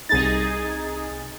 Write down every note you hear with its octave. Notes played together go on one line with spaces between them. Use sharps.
C2 D#4 G#4 A6